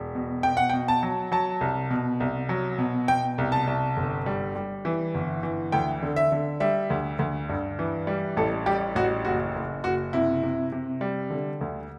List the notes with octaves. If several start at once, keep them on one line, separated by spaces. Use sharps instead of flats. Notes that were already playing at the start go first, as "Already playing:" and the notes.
Already playing: E1
B2
B2 G5
F#5
G5
B2
A5
F#3
F#3 A5
C2
B2
C2
F#3
B2
B2 G5
C2
A5
C2
G1
G3
G3
E3
G1
E3
D2 G5
D3
E5
D3
G3 E5
D2
D2
G2
E3
G3
A1 A4
G3 G4
A1 F#4
F#1 F#4
F#1
F#1 F#4
C3 E4
C3
C3
G3
D3
D2